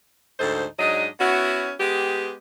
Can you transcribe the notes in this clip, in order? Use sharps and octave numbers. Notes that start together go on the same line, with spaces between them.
D2 G#2 D#4 A4 C5
G#2 F#3 D4 D#5
B3 C#4 E4 F#4
G#3 B3 G4